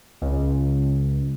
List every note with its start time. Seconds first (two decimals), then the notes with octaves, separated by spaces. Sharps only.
0.22 C#2